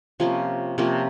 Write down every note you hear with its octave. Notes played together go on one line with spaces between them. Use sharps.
C3 F3 A#3 C#4
C3 F3 A#3 C#4